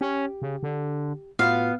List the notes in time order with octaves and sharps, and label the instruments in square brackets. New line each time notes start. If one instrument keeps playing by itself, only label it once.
[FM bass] C#4 [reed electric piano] G4
[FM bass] C#3
D3
[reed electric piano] A2 F4 F#4 [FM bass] B3 [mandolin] F5